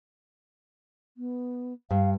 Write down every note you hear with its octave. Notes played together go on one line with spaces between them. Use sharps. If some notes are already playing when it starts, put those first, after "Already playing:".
B3
G2 F5